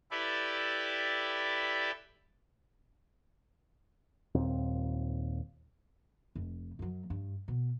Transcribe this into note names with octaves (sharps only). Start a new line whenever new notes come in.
E4 G4 A4 B4 D5 E5
D#1 D#2 A#2 C4
F1
F#2 F#3
G2
B2